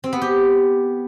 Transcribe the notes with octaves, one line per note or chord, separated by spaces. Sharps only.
C4
B3
G4